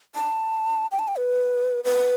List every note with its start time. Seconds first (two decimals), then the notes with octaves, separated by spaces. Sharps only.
0.15 A5
0.91 G5
0.99 A5
1.08 G5
1.16 B4
1.84 B4